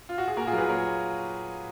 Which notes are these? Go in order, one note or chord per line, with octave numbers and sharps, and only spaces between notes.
F4
F#4
G#4
A#2 F#4 A#4
F4 G#4
F#3 G#4 A#4 B4
A#2 A#4 C#5